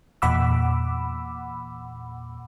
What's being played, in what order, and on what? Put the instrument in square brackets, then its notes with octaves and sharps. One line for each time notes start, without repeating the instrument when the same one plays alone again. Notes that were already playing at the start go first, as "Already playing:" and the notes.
[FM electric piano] E2 A#2 F#5 B5 D6 E6